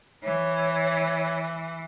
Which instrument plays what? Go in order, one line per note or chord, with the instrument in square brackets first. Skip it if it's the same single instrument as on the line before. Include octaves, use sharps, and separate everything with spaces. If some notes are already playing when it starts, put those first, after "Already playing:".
[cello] E3 [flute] C#5